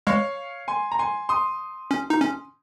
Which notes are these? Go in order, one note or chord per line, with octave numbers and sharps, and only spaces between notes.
G#3 C#5 F5
G#5 C6
A#5
G#5 C6
C6 D#6
C#4
D#4
C#4